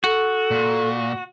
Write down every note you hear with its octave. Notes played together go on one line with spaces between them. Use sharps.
F#4 A4
A#2